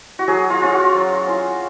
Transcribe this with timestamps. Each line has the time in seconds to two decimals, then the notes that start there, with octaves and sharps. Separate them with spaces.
0.19 F#4
0.28 F#3 G#4
0.50 F4
0.62 C#4 F4
0.72 F#4
0.95 F#3
1.27 C#4 F4